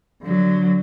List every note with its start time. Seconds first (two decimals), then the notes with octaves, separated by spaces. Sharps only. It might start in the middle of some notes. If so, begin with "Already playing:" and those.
0.22 D3 F#3